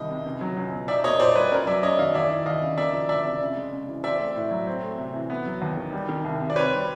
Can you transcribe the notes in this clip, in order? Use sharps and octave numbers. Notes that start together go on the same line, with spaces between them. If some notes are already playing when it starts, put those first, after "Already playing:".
Already playing: C2 D#3 G3 D#5
C3
C#2
F#3
C#2
B2
D#4 D5 E5
A#3 C#5 D#5
A#2 C5 D5
G3 B4 C#5
F#2 A#4 C5
F#3 D5 E5
F#2 C#5 D#5
D#3 D#5 F5
D#2 D5 E5
E3
D#2 D#5 F5
C#3
A#3 D5 E5
F3
D2 D5 E5
C3
C#3
G#3
C#3
E3
C4 D5 E5
A3
A2
F#3
C4
A3
C3
E3
B3
F#3
D#2
D#3
G3
D#3
C2
C3
D5
C4 B4 C#5
G3